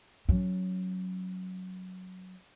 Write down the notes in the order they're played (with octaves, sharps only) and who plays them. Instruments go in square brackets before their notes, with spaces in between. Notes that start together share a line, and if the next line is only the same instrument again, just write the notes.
[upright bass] F#3 C#4